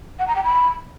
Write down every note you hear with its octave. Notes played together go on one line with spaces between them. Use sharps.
F#5
A#5
G5
B5